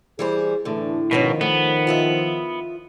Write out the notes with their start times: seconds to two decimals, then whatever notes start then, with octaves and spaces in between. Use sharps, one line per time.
0.19 E3 G3 G#4 C5
0.65 A2 D3 E3 A3 D4
1.11 G#2 B2 D#3 F3 B3 C#4
1.41 A3 B3
1.87 F4 D#5 E5